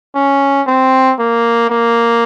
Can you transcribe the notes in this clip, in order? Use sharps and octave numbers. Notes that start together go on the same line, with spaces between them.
C#4
C4
A#3
A#3